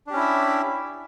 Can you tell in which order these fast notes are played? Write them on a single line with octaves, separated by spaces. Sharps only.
D4 G4 C#4 E4 E5